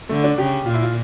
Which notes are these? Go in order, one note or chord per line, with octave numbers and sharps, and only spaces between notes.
D3 A3
D4
C#3 G4
A#2 F4
E4
F4